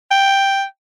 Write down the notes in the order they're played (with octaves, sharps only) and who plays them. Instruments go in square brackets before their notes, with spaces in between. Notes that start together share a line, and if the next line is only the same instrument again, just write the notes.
[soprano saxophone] G5